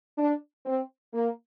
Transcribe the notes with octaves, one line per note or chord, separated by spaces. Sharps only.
D4
C4
A#3